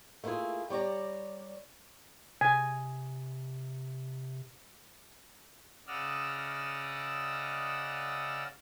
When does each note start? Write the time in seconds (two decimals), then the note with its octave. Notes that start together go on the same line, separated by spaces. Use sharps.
0.24 A3 A#3 E4 F4 G#4
0.70 G3 C#5 D5 A#5
2.41 C3 G#5
5.87 C#3 D5 D#5 F#5 E6 F6